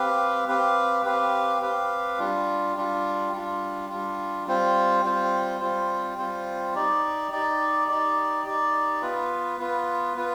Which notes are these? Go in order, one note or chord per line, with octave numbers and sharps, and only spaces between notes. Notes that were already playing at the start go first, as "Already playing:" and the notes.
Already playing: C4 G4 B4 F5
C4 G4 B4 F5
C4 G4 B4 F5
C4 G4 B4 F5
G3 D4 F4
G3 D4 F4
G3 D4 F4
G3 D4 F4
G3 C4 F4 C5
G3 C4 F4 C5
G3 C4 F4 C5
G3 C4 F4 C5
D#4 G4 D5
D#4 G4 D5
D#4 G4 D5
D#4 G4 D5
B3 F4 B4
B3 F4 B4
B3 F4 B4